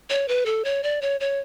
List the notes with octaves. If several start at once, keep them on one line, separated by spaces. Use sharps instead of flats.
C#5
B4
A4
C#5
D5
C#5
C#5